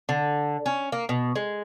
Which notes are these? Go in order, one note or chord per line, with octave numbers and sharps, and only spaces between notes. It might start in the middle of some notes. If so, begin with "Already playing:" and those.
D3
C#4
A#3
B2
G#3